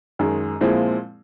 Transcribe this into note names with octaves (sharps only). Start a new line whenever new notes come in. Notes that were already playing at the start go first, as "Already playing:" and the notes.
F#2 D#3 G#3
A#2 F3 G#3 C4 E4